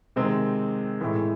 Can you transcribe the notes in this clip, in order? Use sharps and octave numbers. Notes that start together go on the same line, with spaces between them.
C3 D#3 G#3 C4
A2 E3 G#3